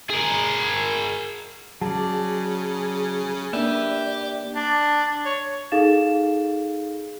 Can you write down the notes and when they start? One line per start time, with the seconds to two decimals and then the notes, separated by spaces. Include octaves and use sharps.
0.10 G#4 A#4
1.81 C#3 F#3 G#4 D5 A5
3.53 A#3 D4 G4 B4 D5 E5
4.55 D4
5.26 C#5
5.72 D#4 G#4 A4 F5 A6 E7